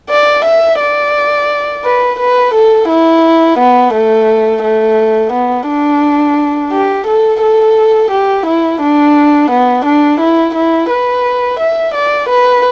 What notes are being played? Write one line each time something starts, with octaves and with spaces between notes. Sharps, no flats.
D5
E5
D5
B4
B4
A4
E4
B3
A3
A3
B3
D4
G4
A4
A4
G4
E4
D4
B3
D4
E4
E4
B4
E5
D5
B4